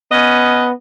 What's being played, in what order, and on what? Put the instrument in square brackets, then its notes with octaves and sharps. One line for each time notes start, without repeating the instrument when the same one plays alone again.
[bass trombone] B3 [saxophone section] C#4 B4 D#5